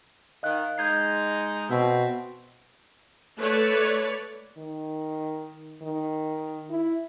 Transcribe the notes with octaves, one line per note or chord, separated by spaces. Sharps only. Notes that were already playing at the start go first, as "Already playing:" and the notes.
D#3 D#5 F5 F#6
G#3 D#4 G6 G#6 C7
B2 C4 F#4 E5
A3 B4 C#5 D5
D#3
D#3
E4